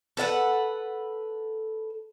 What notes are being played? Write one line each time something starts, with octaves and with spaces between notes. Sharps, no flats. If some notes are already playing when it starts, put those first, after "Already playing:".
A4 B4 F5 F#5